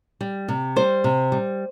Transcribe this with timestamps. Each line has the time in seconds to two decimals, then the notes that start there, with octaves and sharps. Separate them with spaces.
0.21 G3
0.48 C3
0.76 G3 C5
1.04 C3
1.32 G3